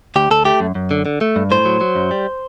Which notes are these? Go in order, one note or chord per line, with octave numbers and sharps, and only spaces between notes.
D2 G4
D2 A4
A3 G4
F#2
F#2
D3
D3
A3
G2
A2 C5
F#3
F#3
F#2
G3